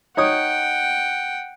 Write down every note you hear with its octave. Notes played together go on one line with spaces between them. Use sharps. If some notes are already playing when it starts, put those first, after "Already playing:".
D#4 C#5 F#5 G5 D#6